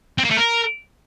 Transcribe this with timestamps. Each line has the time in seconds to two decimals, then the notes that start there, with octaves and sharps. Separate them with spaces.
0.18 C4
0.24 A#3
0.31 A3
0.37 A#4